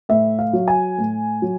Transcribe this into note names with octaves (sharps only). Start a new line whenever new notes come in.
A2 E5
F5
F#3
G#5
A2
F#3